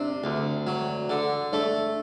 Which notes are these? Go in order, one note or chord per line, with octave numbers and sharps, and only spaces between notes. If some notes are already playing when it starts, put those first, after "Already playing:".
Already playing: C3 C4 D4
D2
F#3
D3
A3 D4